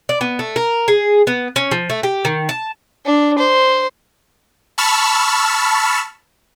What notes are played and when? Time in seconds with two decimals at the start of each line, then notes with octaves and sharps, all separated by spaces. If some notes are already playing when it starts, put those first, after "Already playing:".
0.09 D5
0.21 B3
0.39 A3
0.56 A#4
0.88 G#4
1.27 B3
1.56 C#4
1.71 F3
1.90 A3
2.03 G4
2.25 D#3
2.49 A5
3.06 D4
3.39 C5
4.78 A5 B5 C#6 E6 F6